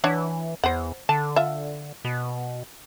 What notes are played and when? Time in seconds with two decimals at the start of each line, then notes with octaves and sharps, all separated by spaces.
0.04 E3 D4 C#5 F#5
0.64 E2 C5 F#5
1.09 D3 A5
1.36 F4 E5
2.05 B2